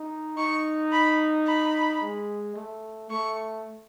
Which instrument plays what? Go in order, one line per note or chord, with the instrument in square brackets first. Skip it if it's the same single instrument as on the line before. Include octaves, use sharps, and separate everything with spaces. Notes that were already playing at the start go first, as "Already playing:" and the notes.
Already playing: [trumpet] D#4
[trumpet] D#4 [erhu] C#6
[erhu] B5
B5
[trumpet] G#3
A3
[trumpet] A3 [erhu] C#6